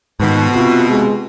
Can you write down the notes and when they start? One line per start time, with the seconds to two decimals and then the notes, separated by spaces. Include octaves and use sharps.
0.20 F2 G#2 B2 D#3
0.55 C3 F4
0.90 G#3